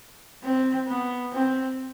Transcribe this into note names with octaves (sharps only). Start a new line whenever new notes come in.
C4
B3
C4